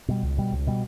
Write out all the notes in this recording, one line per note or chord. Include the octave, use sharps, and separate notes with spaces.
B2 G3
C#2
B2 G3
C#2
B2 G3